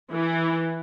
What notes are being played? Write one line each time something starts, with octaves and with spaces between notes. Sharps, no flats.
E3